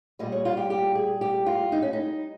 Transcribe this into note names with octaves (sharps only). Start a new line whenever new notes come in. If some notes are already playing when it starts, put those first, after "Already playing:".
A#2 G3 D#5
C#5
F4
G4
G4
G#4
G4
F4
D#4
C#4
D#4